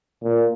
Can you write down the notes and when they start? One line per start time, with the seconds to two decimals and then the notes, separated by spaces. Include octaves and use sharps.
0.23 A#2